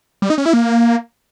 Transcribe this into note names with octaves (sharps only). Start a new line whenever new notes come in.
G3
D#4
C#4
E4
A#3